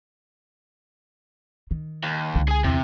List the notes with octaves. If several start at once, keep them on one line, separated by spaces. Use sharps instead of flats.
D#3
D#2
C#2 D3
G#4 G#5
E2 C3